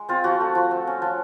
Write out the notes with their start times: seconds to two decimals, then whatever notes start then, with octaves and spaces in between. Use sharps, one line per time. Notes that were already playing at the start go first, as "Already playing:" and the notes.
Already playing: G#3
0.09 C4 F4
0.24 F3 F#4
0.40 A3
0.55 F3
0.71 A3
0.87 C#4
1.02 F3